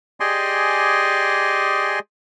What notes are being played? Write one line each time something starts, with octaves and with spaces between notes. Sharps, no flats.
G4 G#4 D5 D#5 G#5 C6